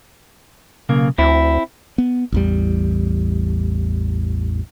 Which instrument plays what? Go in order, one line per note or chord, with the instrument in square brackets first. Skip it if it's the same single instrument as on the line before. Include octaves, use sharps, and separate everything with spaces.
[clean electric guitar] B1 C#3 A#3
[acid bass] D2 [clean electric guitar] C4 E4
[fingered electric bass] B3
A1 E2 G3